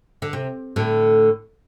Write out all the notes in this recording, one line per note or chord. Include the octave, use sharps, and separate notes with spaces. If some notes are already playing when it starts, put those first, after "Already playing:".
D3
C3
A2 D3